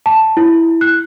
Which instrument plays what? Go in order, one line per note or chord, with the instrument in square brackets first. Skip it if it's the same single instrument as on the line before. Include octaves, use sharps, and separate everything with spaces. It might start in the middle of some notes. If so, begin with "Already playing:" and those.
[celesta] A5
E4
F#6